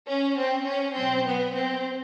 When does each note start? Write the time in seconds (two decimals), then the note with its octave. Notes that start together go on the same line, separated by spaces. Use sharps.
0.09 C#4
0.38 C4
0.67 C#4
0.96 B2 F#3 C4
1.26 B3
1.55 C4